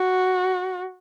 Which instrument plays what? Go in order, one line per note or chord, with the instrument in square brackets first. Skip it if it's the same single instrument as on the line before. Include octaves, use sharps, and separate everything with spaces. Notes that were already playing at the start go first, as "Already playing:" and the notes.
Already playing: [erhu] F#4